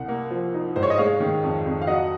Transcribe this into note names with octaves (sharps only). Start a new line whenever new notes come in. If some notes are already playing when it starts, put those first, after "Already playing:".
Already playing: C2 F#5
A#3
F3
D#4
G#2 C5
C#5
D#5
G#3 C#5 F5
D#3
F2
F2
F5
F#3 D#5 F#5